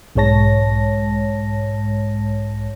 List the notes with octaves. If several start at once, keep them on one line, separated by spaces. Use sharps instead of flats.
B1 G#2 G#3 C#5 A5 A#6